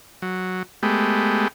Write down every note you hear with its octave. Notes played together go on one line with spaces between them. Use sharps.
F#3
G#3 A3 B3 G4